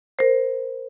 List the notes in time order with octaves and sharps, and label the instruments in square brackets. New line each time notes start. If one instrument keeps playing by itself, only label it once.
[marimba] A#4 C5